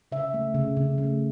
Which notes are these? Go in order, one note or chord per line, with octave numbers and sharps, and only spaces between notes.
C#3 E5
A3
C#3
C#3
A3